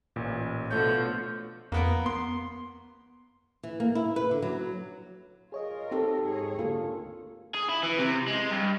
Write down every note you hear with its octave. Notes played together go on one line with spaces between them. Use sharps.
A1 A#2
B2 D3 F3 A3 C#5 G6
F2 A#3 B3 A#4
B3 C6
E3
A#3
E4
B4
D3
F#3
F4 G#4 A#4 C#5 D#5
C4 D#4 G4 A4
G#2 G#4 C#5
D2 A#3 F4 A4
G#4
E4
E3
C3
G#3
G2